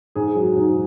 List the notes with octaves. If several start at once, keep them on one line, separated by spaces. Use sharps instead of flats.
G#2 G#4
F#3
G#2